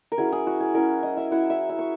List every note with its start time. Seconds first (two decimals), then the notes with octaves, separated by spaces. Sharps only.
0.12 A#4
0.18 F#3 C#4 E4 G#4
0.32 G#4
0.47 F#4
0.61 G#4
0.75 F#3 C#4 E4 A#4
1.03 D#5
1.17 E5
1.31 F#3 C#4 E4 F#5
1.50 E5
1.69 E5
1.79 C#6